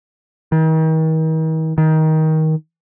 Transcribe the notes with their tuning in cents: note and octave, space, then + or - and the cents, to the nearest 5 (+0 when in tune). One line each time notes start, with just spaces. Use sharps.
D#3 +40
D#3 +20